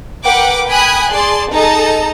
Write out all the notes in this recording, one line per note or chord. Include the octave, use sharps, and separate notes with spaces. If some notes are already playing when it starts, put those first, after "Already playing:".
A#4 B4 F#5 G5 D6
G5 G#5 B5 D#6 F#6 G#6
G#4 D5 A5 C6
D#4 G#4 A4 D#5 A5 A#5